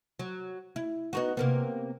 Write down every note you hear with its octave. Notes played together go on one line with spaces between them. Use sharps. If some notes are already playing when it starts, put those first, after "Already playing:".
F#3
E4
B3 D#4 F#4
C3 A#3 B3